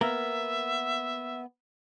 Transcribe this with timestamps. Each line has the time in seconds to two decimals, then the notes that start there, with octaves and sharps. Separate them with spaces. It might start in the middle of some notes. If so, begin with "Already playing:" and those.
0.01 A#3 B3 A#4 E5